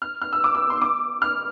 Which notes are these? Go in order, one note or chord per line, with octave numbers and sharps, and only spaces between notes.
F6
F6
E6
D6
E6
C6
D6
F6